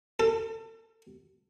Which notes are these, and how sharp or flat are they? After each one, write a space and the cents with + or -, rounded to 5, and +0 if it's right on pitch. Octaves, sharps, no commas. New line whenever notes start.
A4 +35